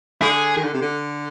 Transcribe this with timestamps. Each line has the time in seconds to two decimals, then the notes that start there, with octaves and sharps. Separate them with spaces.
0.21 D3 G#4
0.56 D#3
0.64 D3
0.74 C3
0.82 D3